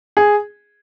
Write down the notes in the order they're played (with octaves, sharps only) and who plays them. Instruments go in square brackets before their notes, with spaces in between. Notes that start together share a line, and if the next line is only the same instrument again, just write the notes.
[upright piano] G#4